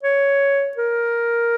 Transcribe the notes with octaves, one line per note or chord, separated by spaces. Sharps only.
C#5
A#4